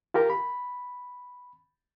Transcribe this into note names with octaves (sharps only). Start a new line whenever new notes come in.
F4 G4 A#4 A#5
B5